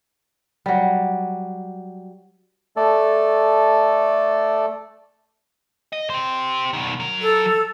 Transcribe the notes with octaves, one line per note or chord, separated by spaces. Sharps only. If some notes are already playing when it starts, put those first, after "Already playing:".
F#3 G3
A3 A4 D5
D#5
G4 C5
B2 D#3
F#3 A#4
A4